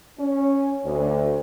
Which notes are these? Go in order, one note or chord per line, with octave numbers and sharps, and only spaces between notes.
C#4
D2